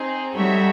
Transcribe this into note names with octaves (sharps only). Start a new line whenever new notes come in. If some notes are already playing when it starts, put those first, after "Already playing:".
Already playing: C4 D#4 G#4
G3 D#4 F#4 A4 C#5 E5